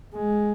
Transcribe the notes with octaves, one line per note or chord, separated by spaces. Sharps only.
G#3